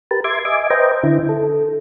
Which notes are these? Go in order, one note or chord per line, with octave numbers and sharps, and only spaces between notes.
G4 A#4 B4 A5
E5 C6 D6 G#6
D#5 E5 G#5 D6
B4 C5 D#5 G5 A#5
D3 E4
A4